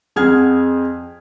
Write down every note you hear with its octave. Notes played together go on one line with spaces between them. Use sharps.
F2 G#4 F#5 F6 G#6